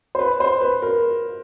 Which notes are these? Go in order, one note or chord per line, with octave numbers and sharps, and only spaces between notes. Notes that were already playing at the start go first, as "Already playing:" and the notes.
C5
B4
C5
B4
A#4